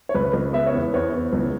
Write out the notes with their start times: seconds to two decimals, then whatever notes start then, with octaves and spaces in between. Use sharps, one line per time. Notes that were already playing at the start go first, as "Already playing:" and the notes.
0.09 C#5
0.15 C#2 B4
0.33 C#2
0.53 B3 E5
0.66 C#5
0.74 E2
0.80 B4
0.94 E2 C#5
1.14 E2
1.33 C#2